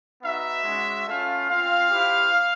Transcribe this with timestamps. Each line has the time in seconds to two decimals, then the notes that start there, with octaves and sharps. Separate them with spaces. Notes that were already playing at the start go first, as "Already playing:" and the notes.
0.22 B3 D#4 F#4 E5
0.64 G#3 C#4 F#4
1.06 A3 C#4 F4 F5
1.48 C4 F4 F5
1.90 C4 E4 G4